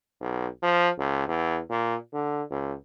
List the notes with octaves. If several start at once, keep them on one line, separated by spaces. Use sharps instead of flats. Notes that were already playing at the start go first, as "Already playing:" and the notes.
B1
F3
C#2
E2
A#2
D3
C#2